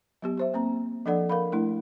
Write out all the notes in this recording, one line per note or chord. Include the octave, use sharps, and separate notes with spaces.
F#3 B3 G4
G4 C5 E5
A#3 C4 A#5
F3 D4 A4 D5 F#5
A#4 F5 B5
A3 D4 E4